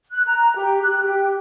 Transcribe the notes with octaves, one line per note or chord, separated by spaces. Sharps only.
F#6
A#5
G4
F#6
G4